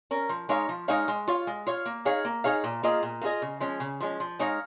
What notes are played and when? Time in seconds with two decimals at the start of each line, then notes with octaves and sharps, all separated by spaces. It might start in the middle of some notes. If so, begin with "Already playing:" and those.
0.11 C#4 A#4
0.29 F3
0.49 G#3 D#4 C#5 F5
0.69 F3
0.88 G#3 D#4 C#5 F5
1.08 G#3
1.28 F4 C#5 F5
1.47 G#3
1.67 F4 C#5 F5
1.86 A#3
2.05 D#4 G#4 C#5 F5
2.25 A#3
2.44 D#4 G#4 C#5 F5
2.64 A#2
2.83 A#3 F4 G#4 D#5
3.03 A#2
3.22 A#3 F4 G#4 D#5
3.42 C#3
3.60 F3 G#3 C#4
3.80 C#3
4.00 F3 G#3 C#4
4.20 F3
4.39 G#3 D#4 C#5 F5